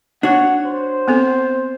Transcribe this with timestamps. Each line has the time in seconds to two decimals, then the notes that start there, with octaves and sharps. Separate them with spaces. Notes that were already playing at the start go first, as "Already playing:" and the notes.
0.23 D4 F#4 C#5 F#5
0.66 C5
1.08 B3 C4 A4